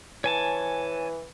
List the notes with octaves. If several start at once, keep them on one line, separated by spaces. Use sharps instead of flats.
E3 C#5 G#5 A5